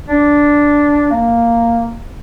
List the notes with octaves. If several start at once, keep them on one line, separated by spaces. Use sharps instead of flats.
D4
A#3